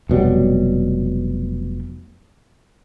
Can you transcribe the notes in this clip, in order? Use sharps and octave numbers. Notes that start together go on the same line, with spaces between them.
F1 B2 F#3 G3